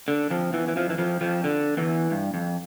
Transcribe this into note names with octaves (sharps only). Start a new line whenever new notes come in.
D3
F2 F3
E2 E3
E3
F2 F3
E3
F2 F3
F2 F3
D3
E2 E3
G2
F2